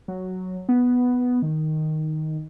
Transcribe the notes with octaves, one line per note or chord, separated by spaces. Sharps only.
F#3
B3
D#3